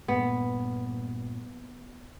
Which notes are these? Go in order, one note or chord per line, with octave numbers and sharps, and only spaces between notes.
G2 A#2 B3